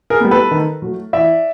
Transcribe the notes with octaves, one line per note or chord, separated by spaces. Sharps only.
G#4 A#4
G3 B3
A4 B4
D#3
F#3 A3
E3 D5 E5